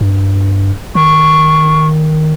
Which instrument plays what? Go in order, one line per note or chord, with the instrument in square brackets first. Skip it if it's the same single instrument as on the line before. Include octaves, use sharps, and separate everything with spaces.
[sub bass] G2
[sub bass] D#3 [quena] C#6